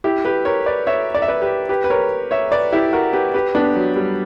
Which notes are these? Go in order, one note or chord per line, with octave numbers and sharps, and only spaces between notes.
E4 G4
G4 B4
A#4 C#5
B4 D5
C#5 E5
D5
E5
B4 D5
G4 B4
G4 B4
B4
A#4 C#5
C#5 E5
B4 D5
E4 G4
F#4 A#4
G4 B4
G4 B4
B3 D4
F#3
G3